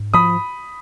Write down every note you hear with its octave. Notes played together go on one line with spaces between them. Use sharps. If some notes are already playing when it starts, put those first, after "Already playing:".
Already playing: G#2
F3 B5 D#6